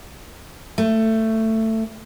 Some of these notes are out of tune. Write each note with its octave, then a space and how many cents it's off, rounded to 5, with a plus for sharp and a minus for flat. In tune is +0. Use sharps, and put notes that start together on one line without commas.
A3 +15